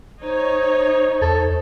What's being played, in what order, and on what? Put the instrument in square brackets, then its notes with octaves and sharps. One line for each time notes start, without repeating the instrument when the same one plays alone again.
[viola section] D#4 C#5 [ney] C5
[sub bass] E2 [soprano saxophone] A4